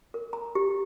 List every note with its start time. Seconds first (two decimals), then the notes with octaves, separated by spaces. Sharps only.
0.14 A#4
0.33 A#5
0.55 G4